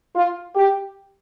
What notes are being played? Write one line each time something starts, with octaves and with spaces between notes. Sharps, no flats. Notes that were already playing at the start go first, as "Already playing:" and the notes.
F4
G4